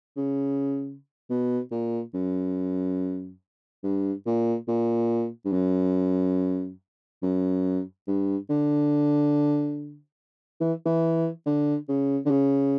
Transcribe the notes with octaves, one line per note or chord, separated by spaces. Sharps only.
C#3
B2
A#2
F#2
G2
A#2
A#2
G2
F#2
F#2
G2
D3
E3
E3
D3
C#3
D3
C#3